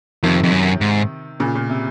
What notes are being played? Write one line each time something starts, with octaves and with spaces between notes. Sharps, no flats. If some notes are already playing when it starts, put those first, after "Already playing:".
F2 C3 D#3
F2
F#2
G#2
A#2 C#3
A#2
C3